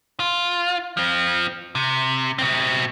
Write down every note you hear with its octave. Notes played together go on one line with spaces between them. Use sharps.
F4
F3 C4
C3
B2 C4